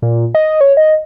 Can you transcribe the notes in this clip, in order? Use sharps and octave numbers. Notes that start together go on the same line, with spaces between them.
A#2
D#5
C#5
D#5